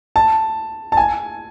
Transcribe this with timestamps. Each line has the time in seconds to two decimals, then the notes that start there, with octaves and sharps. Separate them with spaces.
0.16 A5
0.92 A5
0.97 G#5